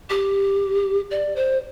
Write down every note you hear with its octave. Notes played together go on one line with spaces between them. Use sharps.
G4
D5
C5